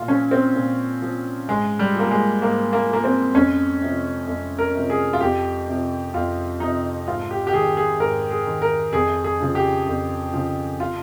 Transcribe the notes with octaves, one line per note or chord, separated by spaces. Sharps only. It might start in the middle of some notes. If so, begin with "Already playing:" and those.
Already playing: A#2 F4
F3 C#4
C4
A#2
F3
G#2 G#3
G3
F3 A#3
G#3
G#2 A#3
A#3
F3 A#3
C4
F2 C#4
C3 F3
F2
A#4
C3 F3
G#4
F4
F2 G4
C3 F3
F2 F4
C3 F3 D#4
G#2 F4
G4
G4
D#3 G#4
G#4
G#2 A#4
G#4
D#3
A#4
F2 G#4
G#4
C#3 F3
G4
F2
C#3 F3
F4